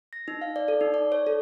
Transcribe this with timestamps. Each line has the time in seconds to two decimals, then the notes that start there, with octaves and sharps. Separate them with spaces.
0.13 A#6
0.28 D#4
0.41 F5
0.56 D5
0.68 A4
0.81 D#4
0.94 D5
1.12 C#5
1.27 A4